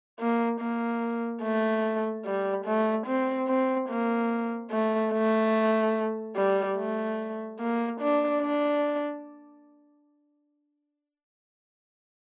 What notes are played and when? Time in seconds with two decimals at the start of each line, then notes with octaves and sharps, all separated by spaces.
0.20 A#3
0.60 A#3
1.43 A3
2.25 G3
2.66 A3
3.07 C4
3.48 C4
3.89 A#3
4.71 A3
5.13 A3
6.36 G3
6.77 A3
7.60 A#3
8.01 D4
8.42 D4